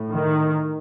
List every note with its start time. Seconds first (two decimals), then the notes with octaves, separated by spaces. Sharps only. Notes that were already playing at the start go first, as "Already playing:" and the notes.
Already playing: A2
0.11 D#3